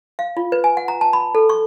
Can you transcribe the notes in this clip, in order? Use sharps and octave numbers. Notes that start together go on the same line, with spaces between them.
F5
F4
B4
G#5
F#5
A#5
A5
B5
A4
C#6